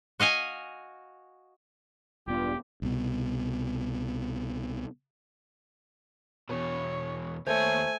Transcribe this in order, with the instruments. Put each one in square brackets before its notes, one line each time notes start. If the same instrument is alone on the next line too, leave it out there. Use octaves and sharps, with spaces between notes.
[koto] F#4 D#5 F5 G#5
[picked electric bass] E1 B3 [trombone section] G2 [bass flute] F4 [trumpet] G4
[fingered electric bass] C2 B2
[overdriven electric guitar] E2 B2 [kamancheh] C#5
[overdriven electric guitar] D#2 C#5 [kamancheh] A3 [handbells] C5 [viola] G#5